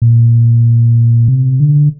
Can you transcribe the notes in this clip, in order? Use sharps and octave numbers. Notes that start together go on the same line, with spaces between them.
A#2
C3
D3